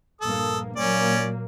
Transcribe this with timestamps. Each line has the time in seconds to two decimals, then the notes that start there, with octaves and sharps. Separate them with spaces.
0.21 A#1 G2 A#3 A4 D#6
0.76 A#2 F#3 A#3 C#4 D5